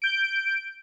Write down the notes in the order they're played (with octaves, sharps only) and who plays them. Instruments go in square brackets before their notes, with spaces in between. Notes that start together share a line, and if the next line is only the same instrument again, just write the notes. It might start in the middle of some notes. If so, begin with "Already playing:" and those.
[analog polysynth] G6 D7